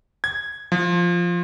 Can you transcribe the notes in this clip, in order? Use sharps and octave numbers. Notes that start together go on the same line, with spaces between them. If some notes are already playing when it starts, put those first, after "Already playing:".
G#6
F3